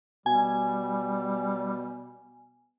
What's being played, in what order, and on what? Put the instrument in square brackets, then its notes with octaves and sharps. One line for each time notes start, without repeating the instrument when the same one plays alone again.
[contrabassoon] B2 [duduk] G3 [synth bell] G#5